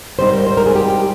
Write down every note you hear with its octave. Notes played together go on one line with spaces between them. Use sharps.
G#2 G3 C4 D#4 C5
A#4
C5
A#4
G#4
G4